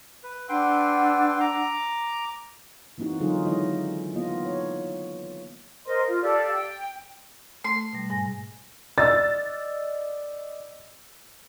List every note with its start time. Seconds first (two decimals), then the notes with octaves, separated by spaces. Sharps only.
0.23 B4
0.49 D4 B4 F#5 G5 C6 E6
1.40 A#5 D6
2.98 E3 A#3 C4 D#4 F#4
3.20 D3 F#3 D#4 F4 G#4
3.45 D#3 G#3 E4 D#5
4.14 A#3 B3 F4 D#5
4.46 C#5
5.86 A#4 C5 D#5 C6
6.06 F4
6.22 G4 A4 D5 F5
6.52 G5
7.64 A3 C6
7.93 B2 G3
8.10 G#2 G#5 A#6
8.98 D5 D#5 E6 A6